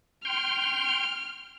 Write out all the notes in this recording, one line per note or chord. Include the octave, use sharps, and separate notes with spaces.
G5 C6 F6